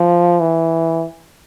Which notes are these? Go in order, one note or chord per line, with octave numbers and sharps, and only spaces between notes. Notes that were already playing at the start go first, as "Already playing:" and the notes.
Already playing: F3
E3